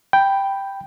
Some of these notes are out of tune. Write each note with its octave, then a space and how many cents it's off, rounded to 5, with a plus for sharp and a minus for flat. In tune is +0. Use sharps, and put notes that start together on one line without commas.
G5 +0 B5 +0